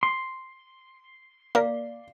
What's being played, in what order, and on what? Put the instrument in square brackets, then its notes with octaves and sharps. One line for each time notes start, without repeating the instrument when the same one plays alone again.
[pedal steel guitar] C6
[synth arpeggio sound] A#3 [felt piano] D5 [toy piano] F5